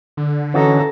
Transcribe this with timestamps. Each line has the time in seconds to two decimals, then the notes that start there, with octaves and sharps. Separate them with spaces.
0.17 D3
0.54 E3 C#4 F#4 A4 D#5 A#5